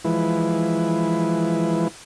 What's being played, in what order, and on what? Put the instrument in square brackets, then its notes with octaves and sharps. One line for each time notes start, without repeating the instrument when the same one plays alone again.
[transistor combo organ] E3 F3 G#3 E4 B4